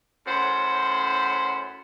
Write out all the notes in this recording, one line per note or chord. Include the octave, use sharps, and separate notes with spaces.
F#2 A2 C5 F#5 B5